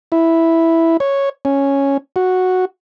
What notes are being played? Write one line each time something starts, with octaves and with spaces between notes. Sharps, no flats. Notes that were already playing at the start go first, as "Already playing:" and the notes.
E4
C#5
C#4
F#4